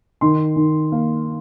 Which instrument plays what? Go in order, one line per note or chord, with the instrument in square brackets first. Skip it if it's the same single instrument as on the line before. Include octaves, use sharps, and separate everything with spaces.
[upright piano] D#3 C6
D#3
A#3